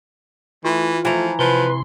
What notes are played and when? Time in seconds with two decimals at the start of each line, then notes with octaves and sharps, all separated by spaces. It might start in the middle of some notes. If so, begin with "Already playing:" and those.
0.65 E3 A3 F4
1.05 E3 F3 A3 A#5
1.39 C3 F3 B4 C6